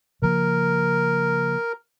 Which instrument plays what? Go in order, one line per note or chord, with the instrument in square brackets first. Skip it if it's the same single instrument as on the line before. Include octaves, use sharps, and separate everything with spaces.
[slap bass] C#3 F3 A#3 [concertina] A#4